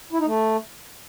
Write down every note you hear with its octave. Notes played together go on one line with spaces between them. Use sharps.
E4
D#4
A3